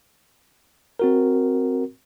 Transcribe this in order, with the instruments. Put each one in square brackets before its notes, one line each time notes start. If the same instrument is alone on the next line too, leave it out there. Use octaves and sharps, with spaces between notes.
[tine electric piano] C4 F#4 A#4